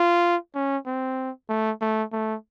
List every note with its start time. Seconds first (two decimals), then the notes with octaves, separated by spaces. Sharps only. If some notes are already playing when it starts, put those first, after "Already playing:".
Already playing: F4
0.55 C#4
0.86 C4
1.49 A3
1.81 A3
2.13 A3